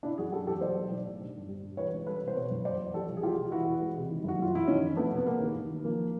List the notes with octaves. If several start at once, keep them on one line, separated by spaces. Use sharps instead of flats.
C#3 D4 E4
F#1 F#4 G#4
F#3 G4 A4
E2 G4 A4
F#3 C5 D5
B1
B1
A2
D3
G1
G3
G2
E3 B4 C#5
C#2
G3 A4 B4
C3
C5
B2 B4 C#5
F#1
F#3 C5 D5
E2
F3 G4 A4
C2
G#4
G#3 F4 G4
C3
E3 E4 F#4
E2
G#3
C3
D#3
F#1 F#4
F#3 F4
F#2 E4
D#3 C#4 D#4
F2
F2 A3 B3
C3
B3
G#3 A#3
D#2
D#2
D#3
F3 A#3